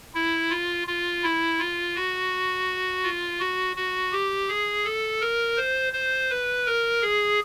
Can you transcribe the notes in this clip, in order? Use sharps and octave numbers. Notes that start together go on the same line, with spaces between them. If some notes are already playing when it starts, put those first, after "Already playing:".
E4
F4
F4
E4
F4
F#4
F4
F#4
F#4
G4
G#4
A4
A#4
C5
C5
B4
A#4
G#4